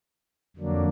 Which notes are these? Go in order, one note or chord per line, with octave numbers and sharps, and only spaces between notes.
F2 D3 F#3 A#3 D4